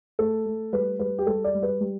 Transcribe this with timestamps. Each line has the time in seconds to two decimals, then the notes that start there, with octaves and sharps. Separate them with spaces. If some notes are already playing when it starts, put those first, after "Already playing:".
0.19 A3 A4
0.45 A3
0.72 G3 B4
0.99 G3 B4
1.19 G4
1.27 G3 A4
1.44 D5
1.54 G3
1.63 B4
1.80 G3